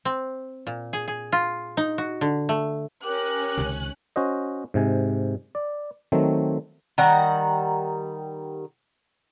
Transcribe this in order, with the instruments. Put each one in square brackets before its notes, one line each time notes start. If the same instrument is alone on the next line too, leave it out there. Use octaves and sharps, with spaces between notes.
[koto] C4
A#2
G#4
G#4
F4
D#4
F#4
D3
A3
[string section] C#4 F#6 [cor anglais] G4 [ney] A#4
[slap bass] C#2 C3 D#3
[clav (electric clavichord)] C#4 F#4 C5 D#5
G#2 C3 G#5
D5
D#3 F#3 A3 C4
[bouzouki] D#3 G3 F#5 A#5